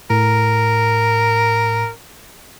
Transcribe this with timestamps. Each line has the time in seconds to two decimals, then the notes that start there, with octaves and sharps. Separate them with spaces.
0.10 A2 A#4